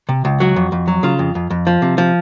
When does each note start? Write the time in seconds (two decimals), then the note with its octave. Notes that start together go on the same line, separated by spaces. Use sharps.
0.09 C3
0.25 C#2
0.40 F#3 F#4
0.56 F2
0.72 F2
0.88 F#3
1.03 C#3 F4
1.19 F2
1.35 F2
1.50 F2
1.67 F3
1.82 C3
1.98 F3